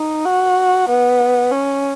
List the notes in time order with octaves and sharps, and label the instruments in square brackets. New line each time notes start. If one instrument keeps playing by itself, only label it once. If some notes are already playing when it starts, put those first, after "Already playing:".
Already playing: [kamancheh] D#4
F#4
B3
C#4